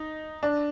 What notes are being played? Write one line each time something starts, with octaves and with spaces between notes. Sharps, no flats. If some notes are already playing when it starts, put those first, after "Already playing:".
Already playing: D#4
D4